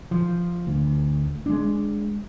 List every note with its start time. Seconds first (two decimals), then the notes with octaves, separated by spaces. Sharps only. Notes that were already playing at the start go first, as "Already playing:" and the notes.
0.11 F3
0.67 D2
1.46 G#3 D4